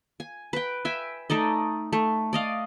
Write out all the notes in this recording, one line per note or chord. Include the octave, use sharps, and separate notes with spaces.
G#5
B4 G5
E5 G5 G#5
A3 D#4 D5 D#5
A3
D5 D#5 F5